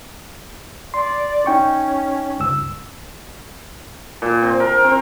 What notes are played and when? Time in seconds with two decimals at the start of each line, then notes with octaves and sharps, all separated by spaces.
0.94 D5 C6
1.46 C#4 D#4 G5 C#6
2.40 C#2 G2 E6
4.22 A#2
4.42 C4
4.60 A#4
4.84 C4